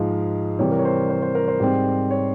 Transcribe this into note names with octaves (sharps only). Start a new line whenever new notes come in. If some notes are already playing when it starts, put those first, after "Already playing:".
Already playing: G#2 F3 G#3 F5
C3 E3 G3 C#5
A#4
C#5
C5
C5
C5
A#4
C5
G#2 G3 C4
C#5